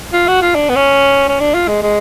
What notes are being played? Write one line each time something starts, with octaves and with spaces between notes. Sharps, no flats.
F4
F#4
F4
D4
B3
C#4
C#4
D4
F4
G#3
G#3